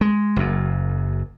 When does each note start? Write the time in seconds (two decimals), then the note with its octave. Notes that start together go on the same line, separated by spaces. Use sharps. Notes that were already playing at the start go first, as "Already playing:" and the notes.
0.01 G#3
0.36 F#1 F#2